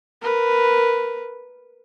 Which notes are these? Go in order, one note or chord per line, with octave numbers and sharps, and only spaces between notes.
A#4 B4